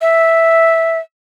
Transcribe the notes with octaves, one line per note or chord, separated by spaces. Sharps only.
E5